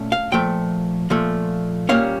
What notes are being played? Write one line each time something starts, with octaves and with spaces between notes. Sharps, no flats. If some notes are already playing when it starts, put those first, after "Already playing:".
Already playing: A#2 A3 C#4
F5
A#2 F3 A3 G5
A#2 F3 A3
A#2 G3 A#3 C#4 F5